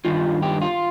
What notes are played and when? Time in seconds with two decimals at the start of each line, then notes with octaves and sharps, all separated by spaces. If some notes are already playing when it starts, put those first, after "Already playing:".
0.05 G2 D#3 F4
0.42 G4
0.62 F4